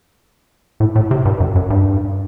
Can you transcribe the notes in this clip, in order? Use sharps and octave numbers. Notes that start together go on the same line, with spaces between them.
A2
A2
C3
G2
F#2
F#2
G2